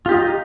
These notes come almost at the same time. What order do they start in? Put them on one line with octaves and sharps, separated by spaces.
F4 G4 D#5 D#4